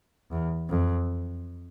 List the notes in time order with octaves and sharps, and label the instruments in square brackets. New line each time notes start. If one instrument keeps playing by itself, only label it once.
[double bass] E2
F2